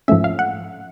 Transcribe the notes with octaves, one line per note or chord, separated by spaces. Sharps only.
G#2 F3 A3 C#4 E5
F5
F#5